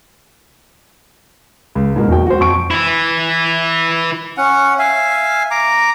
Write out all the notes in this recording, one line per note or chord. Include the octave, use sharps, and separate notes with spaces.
C#2
G#2 B2 A#3 E4
E1 F#4 G5
F#4 C5
F2 C#6 D7
E3 E4
C#4 F#5
E5 F5 G#5
A#5 D6